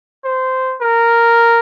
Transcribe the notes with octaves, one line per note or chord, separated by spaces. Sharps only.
C5
A#4